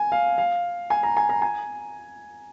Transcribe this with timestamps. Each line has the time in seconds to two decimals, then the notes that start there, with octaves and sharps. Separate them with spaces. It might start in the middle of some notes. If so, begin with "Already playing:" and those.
Already playing: G#5
0.12 F5
0.38 F5
0.90 G#5
1.03 A#5
1.17 G#5
1.29 A#5
1.42 G#5